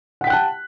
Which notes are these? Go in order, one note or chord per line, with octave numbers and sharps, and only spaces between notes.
F#5 G5 A5 F#6 B6